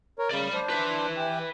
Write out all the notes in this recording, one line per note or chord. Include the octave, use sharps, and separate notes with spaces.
A#4 C#5
C#3 D5 B5
D4 C5
B4 E5
E3 G4